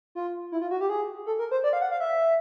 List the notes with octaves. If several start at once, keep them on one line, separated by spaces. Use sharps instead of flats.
F4
E4
F4
F#4
G4
G#4
A4
A#4
C5
D5
F5
F#5
F5
E5